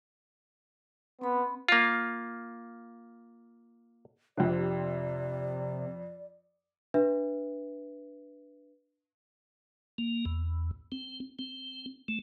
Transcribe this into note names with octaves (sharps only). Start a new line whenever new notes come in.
B3 C4 B5
A#3 F4
F2 C3 D4 D5
D4 B4 E5
A#3
E2
C4
C4
A3